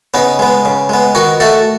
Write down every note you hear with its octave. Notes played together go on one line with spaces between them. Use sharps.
C#3 B3 D#4
G#3 B3
C#3
G#3 B3
D#3 D#4 F#4
A3 F#4 A4